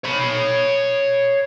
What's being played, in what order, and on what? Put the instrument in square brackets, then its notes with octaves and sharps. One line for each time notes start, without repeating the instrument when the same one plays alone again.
[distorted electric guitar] C#5 B5